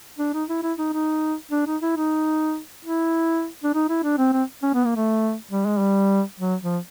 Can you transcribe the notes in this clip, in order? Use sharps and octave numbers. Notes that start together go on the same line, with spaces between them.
D4
D#4
E4
E4
D#4
D#4
D4
D#4
E4
D#4
E4
D4
D#4
E4
D4
C4
C4
C#4
B3
A#3
A3
G3
G#3
G3
F#3
F3